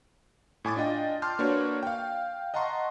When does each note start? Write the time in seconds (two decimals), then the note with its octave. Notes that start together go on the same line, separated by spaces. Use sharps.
0.65 A2 G#5 D6 A6
0.76 D4 F4 D#5 G5
1.22 A5 C6 D6 F6 G6
1.39 A#3 D4 F#4 B4 C#5
1.83 F5 G5
2.54 D#5 F#5 A5 A#5 C6 C#6